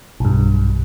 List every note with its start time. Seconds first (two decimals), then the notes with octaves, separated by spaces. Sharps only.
0.20 B1 G2